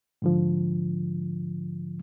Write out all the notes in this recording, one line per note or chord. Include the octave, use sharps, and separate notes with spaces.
G#2 D3 F3